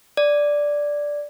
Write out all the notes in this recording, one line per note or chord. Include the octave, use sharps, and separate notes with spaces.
D5